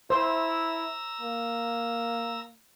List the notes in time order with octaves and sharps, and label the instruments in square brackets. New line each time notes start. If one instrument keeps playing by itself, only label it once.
[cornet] E4 [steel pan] C5 [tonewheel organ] A#5 E6
[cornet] A#3